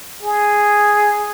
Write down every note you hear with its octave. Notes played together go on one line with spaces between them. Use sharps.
G#4